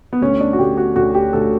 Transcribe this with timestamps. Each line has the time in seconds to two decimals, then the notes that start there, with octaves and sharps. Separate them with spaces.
0.13 B3
0.21 D2 C#4
0.41 D4
0.53 F#4
0.59 D2 G4
0.77 F#4
0.96 D2 F#4
1.15 G4
1.33 D2 A4